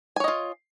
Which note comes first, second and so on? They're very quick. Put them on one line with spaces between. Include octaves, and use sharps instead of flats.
G#5 C#5 D#5 F4